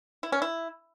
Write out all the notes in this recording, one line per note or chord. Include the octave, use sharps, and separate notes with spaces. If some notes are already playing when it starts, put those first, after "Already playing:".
E4
C#4
E4